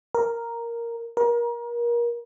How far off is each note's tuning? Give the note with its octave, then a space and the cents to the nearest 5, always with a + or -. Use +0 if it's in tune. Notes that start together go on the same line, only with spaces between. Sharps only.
A#4 +0
A#4 +30